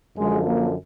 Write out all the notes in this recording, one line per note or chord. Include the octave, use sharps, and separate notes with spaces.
F#2 D3 F3 G#3
A#3